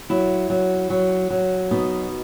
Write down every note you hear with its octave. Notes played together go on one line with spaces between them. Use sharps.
F#3 E4
F#3
F#3
F#3
B2 D#4